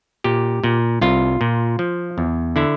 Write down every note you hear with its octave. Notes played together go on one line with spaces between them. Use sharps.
A#2 G4
A#2
C2 F4
A#2
F3
E2
D3 E4